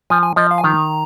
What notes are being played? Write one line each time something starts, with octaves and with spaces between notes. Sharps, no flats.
F3 G#5
G#5
F3 D#5
F5
G#5
D#3 A#5